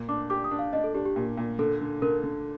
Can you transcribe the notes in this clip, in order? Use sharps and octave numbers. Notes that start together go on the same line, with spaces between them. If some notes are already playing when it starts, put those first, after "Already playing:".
Already playing: A#2
D4 D6
G4 D6
D#6
D4
F5
D4 D#5
A4
D4 G4
G4
A#2
A#2
D3 A4
D3
D3 A#4
D3